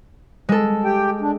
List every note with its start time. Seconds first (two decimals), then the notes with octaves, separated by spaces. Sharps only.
0.49 G#3 A4
0.84 G4 G5
1.21 D4